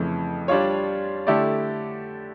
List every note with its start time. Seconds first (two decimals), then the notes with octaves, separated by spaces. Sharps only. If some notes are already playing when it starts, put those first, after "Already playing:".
Already playing: F2 C#3 E3 A3
0.48 G3 D4 F4 C#5
1.27 D3 A3 E4 G4 D5